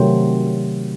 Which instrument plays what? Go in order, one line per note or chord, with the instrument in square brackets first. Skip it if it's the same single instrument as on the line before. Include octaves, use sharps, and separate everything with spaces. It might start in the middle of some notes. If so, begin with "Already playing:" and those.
Already playing: [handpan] C3 D#3 F#3 A3 C4